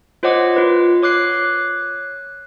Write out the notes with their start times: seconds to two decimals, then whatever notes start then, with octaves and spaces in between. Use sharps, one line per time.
0.23 F4 C5 C#5 D#5 F#5 D6
0.56 F4 B4
1.02 C#5 D6 F#6 C7